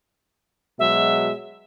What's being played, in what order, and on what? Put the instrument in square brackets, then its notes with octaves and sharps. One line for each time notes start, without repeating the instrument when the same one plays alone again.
[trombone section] B2 F#3 G#3 [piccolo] E5